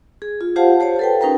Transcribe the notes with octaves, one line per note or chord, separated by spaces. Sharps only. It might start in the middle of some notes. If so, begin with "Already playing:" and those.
G#4
F4
F4 G4 C5 F5 F#5 A5
G4 C5 C#5 A5
A4 B4 G5
C#4 D#4 A#4 B4 G5 A#5